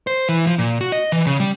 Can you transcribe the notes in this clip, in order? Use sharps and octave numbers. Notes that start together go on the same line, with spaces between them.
C5
E3
F3
A#2
F#4
D#5
E3
C#3
G3